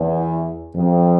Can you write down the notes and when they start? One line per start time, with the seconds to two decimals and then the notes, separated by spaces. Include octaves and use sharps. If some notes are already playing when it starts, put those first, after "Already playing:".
Already playing: E2
0.75 F2